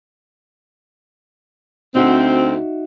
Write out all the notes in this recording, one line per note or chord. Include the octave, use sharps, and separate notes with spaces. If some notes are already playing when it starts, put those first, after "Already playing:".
D2 C4 D#4 F#4 E5